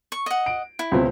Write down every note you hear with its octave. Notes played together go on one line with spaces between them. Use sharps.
C#6
D#5 F#5
D7
E4
C#2 B2 C4